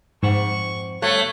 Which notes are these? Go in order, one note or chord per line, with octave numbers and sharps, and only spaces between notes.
F2 G#2 C5 F#5 C#6
D2 G2 A3 B3 C#5 F#6